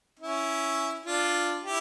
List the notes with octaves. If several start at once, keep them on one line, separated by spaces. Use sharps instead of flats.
C#4 E4
D4 F4
E4 G4